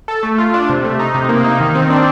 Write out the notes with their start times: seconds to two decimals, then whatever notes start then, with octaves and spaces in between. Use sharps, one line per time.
0.08 A4
0.23 A3
0.38 F4
0.54 D4
0.70 C3
0.84 A3
1.00 D#4
1.15 C3
1.29 A#3
1.44 D#4
1.60 D#3
1.75 C4
1.90 D4